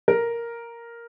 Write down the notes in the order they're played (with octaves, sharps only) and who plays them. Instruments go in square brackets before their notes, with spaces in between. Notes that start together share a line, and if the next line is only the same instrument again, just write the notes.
[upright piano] A#4